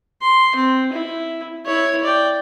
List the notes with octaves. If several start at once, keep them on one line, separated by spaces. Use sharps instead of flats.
C6
C4
E4
E4 C#5
D5 G5